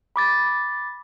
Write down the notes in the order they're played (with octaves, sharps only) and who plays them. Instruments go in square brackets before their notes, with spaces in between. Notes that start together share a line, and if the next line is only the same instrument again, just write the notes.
[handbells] B5 D6 A6